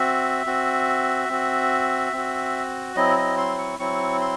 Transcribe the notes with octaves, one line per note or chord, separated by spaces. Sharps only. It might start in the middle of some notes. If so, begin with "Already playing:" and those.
Already playing: C4 F#4 E5
C4 F#4
C4 F#4
C4 F#4
F#3 C4 E4 D#5
D#5
C6
C#6
F#3 C4 E4 C#6
C6